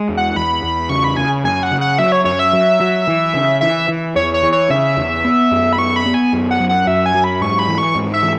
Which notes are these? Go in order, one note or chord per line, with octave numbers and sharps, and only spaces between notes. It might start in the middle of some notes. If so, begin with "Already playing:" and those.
Already playing: G#3
E2
F#5
E2 B5
E2
C#3 C#6
B5
C#3 G#5
F#2 G#5
F#5
C#3
F#5
F#3 E5
C#5
F#2 C#5
E5
F#3
F#3
E3
C#3
E3 E5
E3
E2 C#5
C#5
E3
C#5
C#3 E5
E2
B3
F#2
B5
B3 C#6
B5
B3
G#5
F#2
F#5
F#3
F#5
F#2 E5
G#5
F#3
B5
G#2 C#6
B5
E3
C#6
G#2
E5
E3